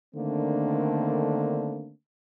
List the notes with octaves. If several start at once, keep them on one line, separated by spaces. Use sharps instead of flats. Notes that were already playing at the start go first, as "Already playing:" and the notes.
D3 D#3 A3 A#3 C4 D4